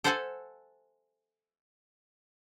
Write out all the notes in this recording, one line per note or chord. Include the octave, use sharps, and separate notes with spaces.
A4 C5 E5 F#5 G#5 A5